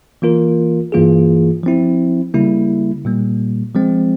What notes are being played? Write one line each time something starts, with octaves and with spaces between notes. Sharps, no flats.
E3 A#3 F4 A#4
G2 E3 A#3 F4 G#4
F3 C4 E4
C#3 G3 A#3 E4
A#2 G3 A#3
F3 G#3 C4